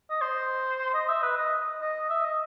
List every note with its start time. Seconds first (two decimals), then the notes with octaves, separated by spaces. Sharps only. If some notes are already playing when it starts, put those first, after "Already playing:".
0.10 D#5
0.21 C5
0.94 D#5
1.08 E5
1.22 B4
1.37 D#5
1.81 D#5
2.09 E5
2.24 D#5